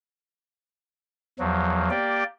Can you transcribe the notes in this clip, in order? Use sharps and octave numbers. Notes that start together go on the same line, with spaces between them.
E2 F3 F#3
A#3 G4 D5 G5